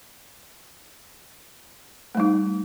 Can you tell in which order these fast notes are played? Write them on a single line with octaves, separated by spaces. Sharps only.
A3 G3 D#4